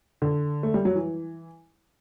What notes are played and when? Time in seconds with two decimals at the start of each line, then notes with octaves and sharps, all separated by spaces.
0.22 D3
0.63 A3
0.74 G3
0.85 F#3
0.95 E3